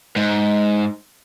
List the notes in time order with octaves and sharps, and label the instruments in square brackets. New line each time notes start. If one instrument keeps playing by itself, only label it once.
[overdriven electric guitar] G#2